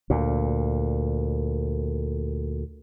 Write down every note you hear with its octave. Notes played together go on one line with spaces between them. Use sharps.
D2 A#2